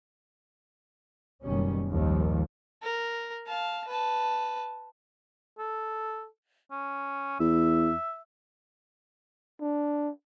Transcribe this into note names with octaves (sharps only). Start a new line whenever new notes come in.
F#1 B2 D#3 G3 C#4
A#1 D#2 G#2 D#3 F3 G3
A#4
F5 A5
B4 A5
A4
C#4
E2 E5
D4